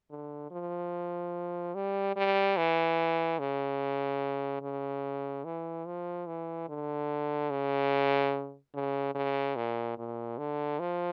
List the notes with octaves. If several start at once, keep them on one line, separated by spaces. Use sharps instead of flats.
D3
F3
G3
G3
E3
C#3
C#3
E3
F3
E3
D3
C#3
C#3
C#3
A#2
A#2
D3
F3